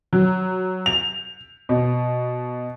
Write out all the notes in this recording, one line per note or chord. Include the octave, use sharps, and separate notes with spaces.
F#3
F7
B2